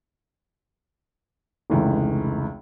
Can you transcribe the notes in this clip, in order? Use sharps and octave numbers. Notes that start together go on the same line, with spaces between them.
F1 C#2 E3